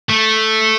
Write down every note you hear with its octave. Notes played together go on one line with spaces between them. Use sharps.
A3